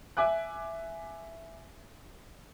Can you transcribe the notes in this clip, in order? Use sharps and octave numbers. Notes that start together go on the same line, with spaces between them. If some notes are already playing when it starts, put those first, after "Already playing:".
E5 G#5 D6 F#6